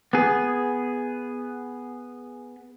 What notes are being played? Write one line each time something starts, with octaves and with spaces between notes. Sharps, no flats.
B3 G#4